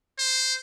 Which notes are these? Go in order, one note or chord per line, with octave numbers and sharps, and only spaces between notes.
C5